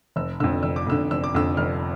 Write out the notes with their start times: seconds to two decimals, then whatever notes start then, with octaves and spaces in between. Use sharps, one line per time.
0.16 F1 E6
0.40 F2 D3 E6
0.63 F1 E6
0.76 D6
0.87 F2 D3 E6
1.11 F1 E6
1.24 D6
1.35 F2 D3 E6
1.57 F1 F6